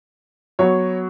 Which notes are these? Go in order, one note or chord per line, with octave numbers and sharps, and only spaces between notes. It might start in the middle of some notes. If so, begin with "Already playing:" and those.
F#3 B3 F#4 C#5